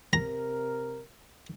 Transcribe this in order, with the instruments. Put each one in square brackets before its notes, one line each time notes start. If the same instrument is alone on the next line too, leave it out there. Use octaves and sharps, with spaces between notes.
[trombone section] C3 A#4 [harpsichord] A#5